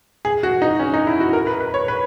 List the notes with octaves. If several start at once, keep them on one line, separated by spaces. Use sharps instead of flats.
G#4
F#4
D#4
C#4
D#4
E4
F#4
A#4
B4
B4
C#5
B4